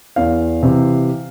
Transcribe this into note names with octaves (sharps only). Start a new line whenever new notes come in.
E2 F5
C3 E3